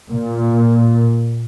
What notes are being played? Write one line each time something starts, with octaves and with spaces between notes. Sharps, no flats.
A#2